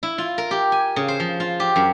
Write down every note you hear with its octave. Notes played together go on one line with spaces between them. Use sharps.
E4
F4
A#4
G4
G#5
C#3
C5
F3
F4
G4
F#2